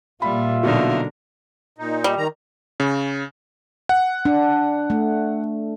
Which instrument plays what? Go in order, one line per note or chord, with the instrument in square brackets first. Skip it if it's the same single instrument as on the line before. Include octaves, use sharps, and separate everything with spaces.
[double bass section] A#2 [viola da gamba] G3 [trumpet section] F4 E5 [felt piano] B5
[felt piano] B2 D#4 F#4 [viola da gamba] D3 F#3 A#4
[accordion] A#2 D#4
[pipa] G3
[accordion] D#3 A#5
[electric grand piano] C#3
F#5
[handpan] D4
A3